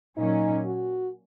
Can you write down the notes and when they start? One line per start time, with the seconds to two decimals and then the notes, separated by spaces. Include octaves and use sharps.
0.17 A#2 F#3 C#4 D#4
0.66 F#4